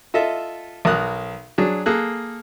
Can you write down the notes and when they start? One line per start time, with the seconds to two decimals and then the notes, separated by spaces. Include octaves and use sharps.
0.14 F4 A4 D#5 E5
0.85 B1 A#4 D#6 F#6
1.58 F#3 D4 G#4
1.86 A#3 G#4 A4 F#6